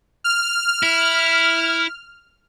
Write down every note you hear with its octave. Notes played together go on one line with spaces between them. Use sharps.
F6
E4